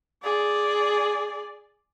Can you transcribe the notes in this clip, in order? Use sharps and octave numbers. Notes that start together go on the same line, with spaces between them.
G#4 D5